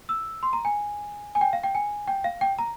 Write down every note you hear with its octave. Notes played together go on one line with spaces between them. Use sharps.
E6
C6
A#5
G#5
G#5
G5
F5
G5
G#5
G5
F5
G5
A#5